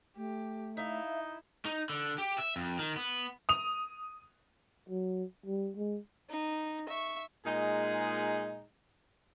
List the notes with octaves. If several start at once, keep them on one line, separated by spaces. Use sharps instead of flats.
A3 G4
D#4 E4 E5 F5
D#4
D3
G4
E5
F2
D#3
B3
D#6 F7
F#3
G3
G#3
D#4
E5 C#6
A#2 G#3 D#4 G#4